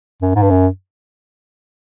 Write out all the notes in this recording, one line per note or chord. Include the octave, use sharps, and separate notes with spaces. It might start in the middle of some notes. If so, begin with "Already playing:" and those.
F#2
G#2
G2
F#2